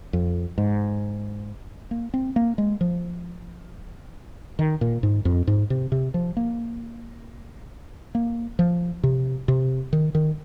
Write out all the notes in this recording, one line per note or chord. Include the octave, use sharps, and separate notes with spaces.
F2
G#2
A#3
C4
A#3
G#3
F3
D#3
A#2
G#2
F2
G#2
C3
C3
F3
A#3
A#3
F3
C3
C3
D#3
D#3